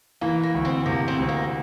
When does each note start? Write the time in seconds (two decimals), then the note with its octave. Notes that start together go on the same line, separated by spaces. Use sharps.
0.21 E3 A#3
0.43 A#3
0.54 D2
0.65 C4
0.86 C3 A#3
1.08 C4
1.19 D2
1.29 A#3